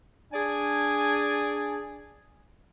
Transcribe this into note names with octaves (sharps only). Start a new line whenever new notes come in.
D4 G#4 D5 G#5